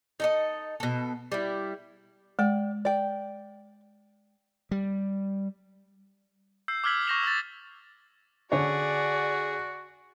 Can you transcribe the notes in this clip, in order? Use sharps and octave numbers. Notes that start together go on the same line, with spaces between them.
D#4 A4 D#5
B2 A4
G3 E4
G#3 D5 G5
D5 G5
G3
E6 G6 C7
D6 E6 F6 G#6 B6 F#7
C#6 G6 A#6 C7 E7 F7
E6 A6
D3 F#4 G#4 C#5 D5